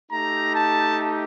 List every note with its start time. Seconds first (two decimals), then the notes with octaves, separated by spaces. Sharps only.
0.11 A3 D#4 G4 A#5
0.55 A5